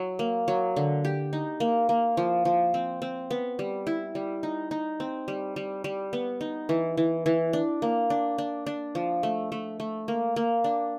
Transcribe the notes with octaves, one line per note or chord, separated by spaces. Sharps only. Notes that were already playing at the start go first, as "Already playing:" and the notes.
Already playing: F#3
A#3
F#3
D3
G4
D#4
A#3
A#3
F3
F3
C4
C4
B3
G3
E4
G3
D#4
D#4
C4
G3
G3
G3
B3
D#4
E3
E3
E3
D4
A#3
D4
D4
D4
F3
A3
A3
A3
A#3
A#3
D4